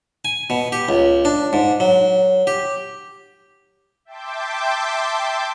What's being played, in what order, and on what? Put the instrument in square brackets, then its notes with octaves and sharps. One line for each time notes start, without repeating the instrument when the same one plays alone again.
[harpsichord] G#5
B2
G4
C#2
D4
G#2
F#3
G4
[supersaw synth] E5 G5 A5 C6 D6 G6